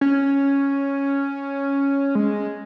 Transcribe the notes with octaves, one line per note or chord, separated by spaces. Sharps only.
C#4
G#3